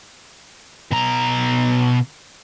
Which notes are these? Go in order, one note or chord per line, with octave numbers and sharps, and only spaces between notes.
B2 A#5